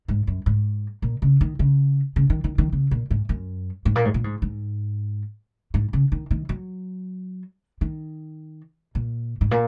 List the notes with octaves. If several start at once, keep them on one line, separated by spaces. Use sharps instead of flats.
G#2
F#2
G#2
A#2
C#3
D#3
C#3
C#3
D#3
D#3
D#3
C#3
A#2
G#2
F#2
G#2
A#2
G#2
A#2
G#2
G#2
G#2
C#3
D#3
D#3
F#3
D#3
A#2
G#2
A#2